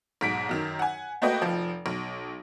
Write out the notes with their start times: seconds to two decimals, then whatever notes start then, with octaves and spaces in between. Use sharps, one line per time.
0.21 B1 G#2 B6 D7
0.49 F#2 D#3
0.79 F#5 G#5
1.22 A3 A#3 F#4 B4 D#5 G5
1.42 F1 F3
1.86 B1